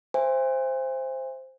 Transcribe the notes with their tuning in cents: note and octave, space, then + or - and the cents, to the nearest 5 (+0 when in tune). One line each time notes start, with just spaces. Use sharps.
C5 +0 E5 +30 G#5 -35